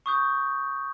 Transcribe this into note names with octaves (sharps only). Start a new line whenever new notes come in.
C#6 D#6 G6